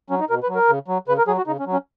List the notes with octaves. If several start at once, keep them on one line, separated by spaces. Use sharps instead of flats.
F#3 C#4
D#4
B2 A#4
B4
F#3
A#4
C#3
F#3
C#3 B4
A#4
F#3 G#4
F#4
C#3 D#4
C#4
F#3
C#4